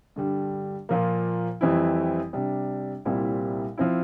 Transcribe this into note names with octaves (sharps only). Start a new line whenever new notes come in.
G2 D3 G3
A#2 F3 A#3
F2 E3 G3 C4 E4
C3 G3 D4
C2 A#2 G3 C4 E4
F3 C4 E4